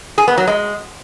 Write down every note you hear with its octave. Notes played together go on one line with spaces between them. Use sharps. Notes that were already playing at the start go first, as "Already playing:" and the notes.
G#4
B3
F#3
G#3